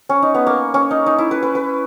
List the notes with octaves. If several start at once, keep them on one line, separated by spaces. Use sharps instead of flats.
C#4
D#4
B3
A#3
C#4
D#4
D#4
E4
B4
B4
B4